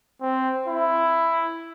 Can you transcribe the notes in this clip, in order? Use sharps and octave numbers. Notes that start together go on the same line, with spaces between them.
C4
E4